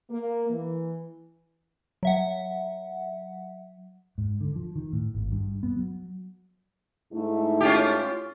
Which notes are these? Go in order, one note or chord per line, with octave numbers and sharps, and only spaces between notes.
A#3
E3
F#3 E5 F#5
G#2
D3
F3
D#3
A2
G#1
G2
B3
F#3
G#2 A3 E4
C#4 F4 G4